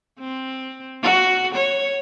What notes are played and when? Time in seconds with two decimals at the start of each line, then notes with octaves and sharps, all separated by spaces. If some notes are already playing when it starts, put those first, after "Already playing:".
0.20 C4
1.03 F#4
1.55 C#5